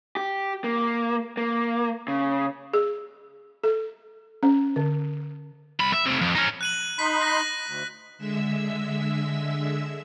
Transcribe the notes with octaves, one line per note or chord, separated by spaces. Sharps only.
G4
A#3
A#3
C#3
G#4
A4
C#4
D3
C2 B5
E5
C3 A3
F2
C#4 D#4
F#6 D#7 F#7
D#4 B5 C6 B6
F#6 A#6
D2
D3 G#3 E5 E6